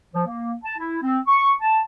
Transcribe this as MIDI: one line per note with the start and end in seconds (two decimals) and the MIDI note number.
0.14 0.23 53
0.25 0.53 58
0.64 0.74 81
0.78 0.98 64
1.03 1.18 60
1.28 1.53 85
1.61 1.80 81